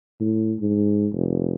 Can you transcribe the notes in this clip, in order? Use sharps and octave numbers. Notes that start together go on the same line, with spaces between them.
A2
G#2
F1